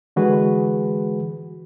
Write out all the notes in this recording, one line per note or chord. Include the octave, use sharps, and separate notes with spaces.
D3 E3 G#3 F#4 G#4 B4